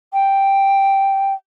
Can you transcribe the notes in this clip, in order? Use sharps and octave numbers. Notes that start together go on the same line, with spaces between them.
G5